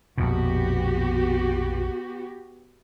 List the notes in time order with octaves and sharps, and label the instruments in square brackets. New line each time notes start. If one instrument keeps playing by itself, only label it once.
[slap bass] A#1 F2 B2 [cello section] B3 F#4 G4